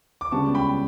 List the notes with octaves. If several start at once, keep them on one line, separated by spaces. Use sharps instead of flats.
D6
C#2 C#3 G3 B3 D4 A5 C#6
G5 B5